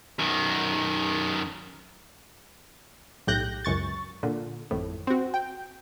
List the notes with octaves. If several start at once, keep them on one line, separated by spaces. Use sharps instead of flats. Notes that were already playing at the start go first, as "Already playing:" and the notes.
F#2 D#3
B1 A2 G4 F#6 G6 A#6
C#2 F#2 C#6 A6
A#2 D3
G#1 F2 A2
C4 F#4
G5